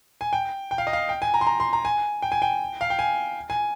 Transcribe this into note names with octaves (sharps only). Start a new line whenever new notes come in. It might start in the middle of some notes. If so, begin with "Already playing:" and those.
G#5
G5
G5
F5
D#5
F5
G5
G#5
A#5
C6
A#5
C6
A#5
G#5
G5
G#5
G5
F5
G5
G#5
G#5